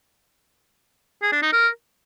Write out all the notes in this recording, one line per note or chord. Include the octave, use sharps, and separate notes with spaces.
G#4
D4
D#4
A#4